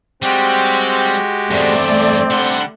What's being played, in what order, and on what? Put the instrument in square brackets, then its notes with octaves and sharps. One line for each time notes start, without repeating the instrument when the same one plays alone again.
[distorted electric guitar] G3 [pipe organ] G#3 F#4 G4 [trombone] C4
[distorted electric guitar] E2 G2 [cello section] A3 D5 [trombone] C4
[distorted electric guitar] D3 C6 [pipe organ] G3 F#5